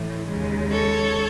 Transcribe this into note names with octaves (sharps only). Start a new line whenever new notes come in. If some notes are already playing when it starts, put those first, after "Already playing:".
Already playing: A2 E3
D#2 C#3 G#3
A4 C#5